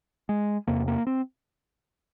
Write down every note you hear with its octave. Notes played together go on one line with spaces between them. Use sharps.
G#3
E2 C3 A#3
A#3
C4